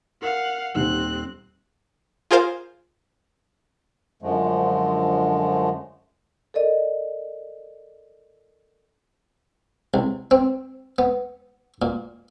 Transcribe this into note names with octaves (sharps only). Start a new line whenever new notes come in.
A#4 F5 F#5
D#1 D#2 C4 F#6
F4 G#4 A#4 C5 F5
F#2 D3 F3 G#3 A3
A4 A#4 D5 D#5
C2
C4
B3
A#2